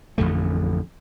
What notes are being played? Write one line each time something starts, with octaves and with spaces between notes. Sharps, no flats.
A1 F2 D3 A3